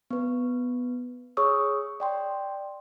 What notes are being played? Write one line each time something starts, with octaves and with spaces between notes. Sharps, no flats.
B3 B4
G#4 C#5 C#6 D#6 E6
D5 G5 C6